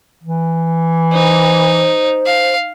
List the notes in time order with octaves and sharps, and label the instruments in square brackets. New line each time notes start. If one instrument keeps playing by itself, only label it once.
[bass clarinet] E3
[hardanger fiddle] D#4 [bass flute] C5
[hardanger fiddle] F5